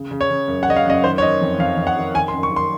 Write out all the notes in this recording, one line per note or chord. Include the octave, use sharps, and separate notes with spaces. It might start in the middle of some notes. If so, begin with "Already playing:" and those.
Already playing: C#3
C#3
C#5
C#3
F#2
F#5
C#3 D#5
F5
F#2 D#5
D#3 C5
C#5
D#3 D#5
F2
F2 F5
F2
F#5
D#3
D#3 G#5
C6
F#2
C#6
D#3
C6